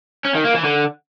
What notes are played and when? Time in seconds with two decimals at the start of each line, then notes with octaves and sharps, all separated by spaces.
0.25 C#4
0.35 D#3
0.44 A#3
0.54 E3
0.64 D3